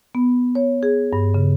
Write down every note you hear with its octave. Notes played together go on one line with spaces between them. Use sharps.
B3
C#5
G#4
G2
C#3